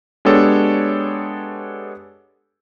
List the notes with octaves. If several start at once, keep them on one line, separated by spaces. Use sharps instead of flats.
G#3 B3 D4 G4 A4 C#5